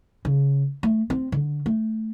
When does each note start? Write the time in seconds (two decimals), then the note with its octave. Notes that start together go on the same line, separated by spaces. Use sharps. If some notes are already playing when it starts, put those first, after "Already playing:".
0.25 C#3
0.83 A3
1.10 C4
1.32 D3
1.66 A3